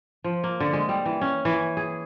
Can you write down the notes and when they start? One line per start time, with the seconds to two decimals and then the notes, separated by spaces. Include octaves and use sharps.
0.24 F3
0.44 A#3
0.60 D3
0.73 G#3
0.89 G3
1.05 E3
1.21 C#4
1.45 E3
1.77 G#4